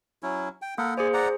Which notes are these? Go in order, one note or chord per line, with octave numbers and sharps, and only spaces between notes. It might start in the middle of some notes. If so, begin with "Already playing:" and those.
F#3 C#4 E4
G5
A#3 A4 A#4 F#5
G#4 C5 D5 G#5
D5 F#5 A#5